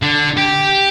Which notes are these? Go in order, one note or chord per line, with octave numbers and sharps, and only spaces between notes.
D3
G4